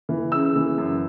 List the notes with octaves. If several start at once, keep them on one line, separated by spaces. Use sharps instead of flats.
E3
C#3 E6
E3
F#2